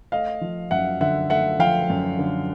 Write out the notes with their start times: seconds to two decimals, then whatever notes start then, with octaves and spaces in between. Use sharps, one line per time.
0.12 A3 D#5 F5
0.41 F3
0.71 F#2 E5 F#5
1.01 D3 E5 F#5
1.30 A3 E5 F#5
1.59 F3 F5 G5
1.90 F#2
2.19 D3